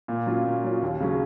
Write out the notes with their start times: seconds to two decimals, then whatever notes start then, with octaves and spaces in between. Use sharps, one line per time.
0.08 A#2
0.26 F#3 C#4 F4
0.45 A#2
0.64 F#3 C#4 F4
0.82 D#2
1.00 C#3 F#3 C#4